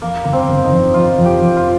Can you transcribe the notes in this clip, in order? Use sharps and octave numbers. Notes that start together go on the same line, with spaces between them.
F2 A#3
G1 A#3
C4
G1
D#4
F2
F2 F4
F2
G4
F2
F4